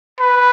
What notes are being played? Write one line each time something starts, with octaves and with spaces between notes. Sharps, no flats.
B4